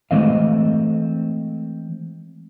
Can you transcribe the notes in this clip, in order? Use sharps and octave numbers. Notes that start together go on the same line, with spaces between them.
E3 G#3 A3 C4 D#5 F5